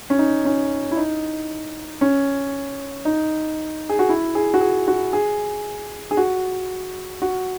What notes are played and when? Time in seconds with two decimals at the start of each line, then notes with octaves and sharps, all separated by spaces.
0.10 C#4
0.19 D#4
0.45 C#4
0.91 E4
0.97 D#4
2.01 C#4
3.05 D#4
3.89 G#4
3.99 F#4
4.09 E4
4.35 G#4
4.54 F#4
4.61 G#4
4.88 F#4
5.13 G#4
6.11 G#4
6.17 F#4
7.22 F#4